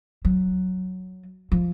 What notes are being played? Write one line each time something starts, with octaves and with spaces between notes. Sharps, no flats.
F#3
F3